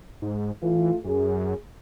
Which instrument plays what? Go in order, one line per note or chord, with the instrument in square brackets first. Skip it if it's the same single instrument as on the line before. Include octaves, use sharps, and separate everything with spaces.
[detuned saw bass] G#2
[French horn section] A2 A3 F4 [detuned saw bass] E3
[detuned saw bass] F#2 [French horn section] G#4